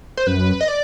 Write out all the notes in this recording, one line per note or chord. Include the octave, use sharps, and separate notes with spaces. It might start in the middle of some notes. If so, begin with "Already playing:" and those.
C5
F#2 B4
D#5
D5